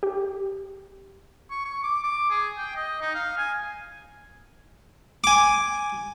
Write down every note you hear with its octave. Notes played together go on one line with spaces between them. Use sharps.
G4
C#6
C#6
D6
D6
G#4
G5
D#5
D#4
F5
G#5
G#5 D6